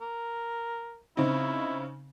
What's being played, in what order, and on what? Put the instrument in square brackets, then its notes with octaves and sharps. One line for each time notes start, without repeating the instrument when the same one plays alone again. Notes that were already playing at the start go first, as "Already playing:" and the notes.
[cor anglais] A#4
[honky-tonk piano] C#3 C4 D#4 [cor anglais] E4